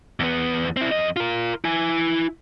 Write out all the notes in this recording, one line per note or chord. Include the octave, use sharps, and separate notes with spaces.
E2 B3
C4 E4
F2 D#5
F4 A#4
E4 G#5